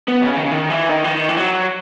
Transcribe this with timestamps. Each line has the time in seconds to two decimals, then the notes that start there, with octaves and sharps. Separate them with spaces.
0.08 B3
0.22 C#3
0.37 D#3
0.45 C#3
0.52 D#3
0.70 E3
0.89 D#3
1.04 E3
1.08 D#3
1.29 E3
1.37 F#3